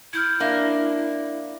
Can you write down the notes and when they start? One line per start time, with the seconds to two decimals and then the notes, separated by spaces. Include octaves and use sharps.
0.13 E4 F6 G6 G#6
0.40 A#3 D4 E5